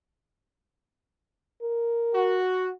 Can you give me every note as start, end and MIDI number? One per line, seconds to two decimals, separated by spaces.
1.62 2.38 70
2.15 2.71 66